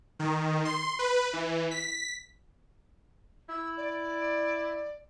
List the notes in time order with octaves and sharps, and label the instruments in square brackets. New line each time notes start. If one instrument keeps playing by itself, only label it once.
[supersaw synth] D#3
C6
B4
E3
B6
[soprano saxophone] E4 [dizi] E6
[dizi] D5